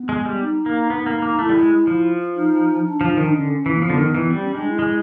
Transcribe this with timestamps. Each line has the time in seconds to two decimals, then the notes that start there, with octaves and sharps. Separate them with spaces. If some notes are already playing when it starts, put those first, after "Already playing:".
Already playing: B3
0.09 G#3
0.25 G3
0.41 D#4
0.66 A#3
0.90 B3 D#4
1.06 A#3
1.22 A#3
1.38 A3 E4
1.49 G3
1.55 G#3
1.87 F3
2.36 D#4
2.85 D4
3.01 F3
3.11 D#4
3.17 D#3
3.22 D4
3.33 D3 C#4
3.66 E3
3.75 A#3
3.82 F3 B3
3.90 D3
3.98 D#3
4.15 E3
4.30 G3 C4
4.42 C#4
4.54 G#3 D4
4.67 E4
4.79 G#3